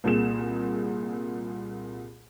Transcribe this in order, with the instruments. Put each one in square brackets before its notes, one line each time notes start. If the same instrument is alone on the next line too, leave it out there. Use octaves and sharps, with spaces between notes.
[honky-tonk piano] C2 A#2 G#4 E7